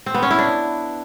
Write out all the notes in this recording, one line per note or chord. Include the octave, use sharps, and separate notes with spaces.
C4
B3
C#4
E4
D4